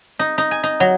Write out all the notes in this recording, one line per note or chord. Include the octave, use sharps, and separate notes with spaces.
D#4
D#4
G#5
D#4
F#3